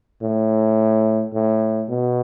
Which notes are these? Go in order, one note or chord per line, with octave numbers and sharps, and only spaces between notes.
A2
A2
B2